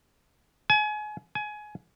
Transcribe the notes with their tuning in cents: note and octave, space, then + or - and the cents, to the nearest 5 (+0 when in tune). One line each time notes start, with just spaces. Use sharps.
G#5 +30
G#5 +20